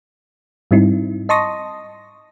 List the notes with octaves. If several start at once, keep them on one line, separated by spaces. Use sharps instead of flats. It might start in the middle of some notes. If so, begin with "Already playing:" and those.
G#2 G3 C4 D#4 E4
D#5 A5 C6 C#6 D#6 A#6